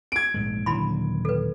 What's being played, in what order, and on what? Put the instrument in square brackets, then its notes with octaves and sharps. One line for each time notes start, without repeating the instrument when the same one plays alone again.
[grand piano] G#6 D7
[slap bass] A#1 G#2 G#3
[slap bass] D#1 D3 F#3 [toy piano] E4 B5 C6
[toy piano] A4 B4